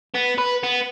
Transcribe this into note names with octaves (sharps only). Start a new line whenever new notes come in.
B3
B4
B3